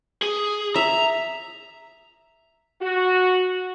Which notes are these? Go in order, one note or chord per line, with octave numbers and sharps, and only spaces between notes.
G#4
E5 A#5
F#4